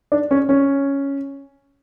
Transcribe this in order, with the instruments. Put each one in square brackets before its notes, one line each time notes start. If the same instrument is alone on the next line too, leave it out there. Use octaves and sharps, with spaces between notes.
[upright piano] D4
C#4
C#4